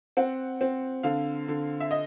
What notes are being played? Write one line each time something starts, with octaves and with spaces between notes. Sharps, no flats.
C4 F#5
C4
D3 F5
D3
E5
D#5